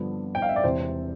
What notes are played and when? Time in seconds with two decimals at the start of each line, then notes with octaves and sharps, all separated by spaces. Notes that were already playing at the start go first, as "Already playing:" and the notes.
Already playing: G2 D3 F3 B3 D4
0.35 G5
0.42 F5
0.49 E5
0.56 D5
0.63 E1 E2 C3 C5